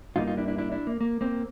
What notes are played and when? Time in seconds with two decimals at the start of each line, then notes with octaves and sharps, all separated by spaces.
0.16 G2 E3 G3 A#3 D#4 F4
0.27 D#4 F4
0.37 D4 E4
0.48 D4 E4
0.58 D4 E4
0.72 D4 E4
0.87 A#3
1.01 A#3
1.21 A#3 C4